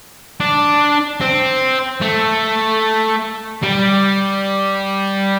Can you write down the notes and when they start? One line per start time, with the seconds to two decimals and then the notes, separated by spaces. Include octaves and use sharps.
0.40 D4
1.21 C4
2.02 A3
3.63 G3